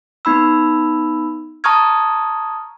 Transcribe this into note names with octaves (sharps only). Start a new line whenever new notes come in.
B3 D#4 B5 E6
A5 A#5 C#6 D#6 F6 G#6